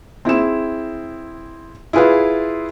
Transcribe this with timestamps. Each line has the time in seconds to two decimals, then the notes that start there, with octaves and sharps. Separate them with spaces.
0.25 C4 E4 G#4 E7
1.93 E4 F4 G#4 B4 F5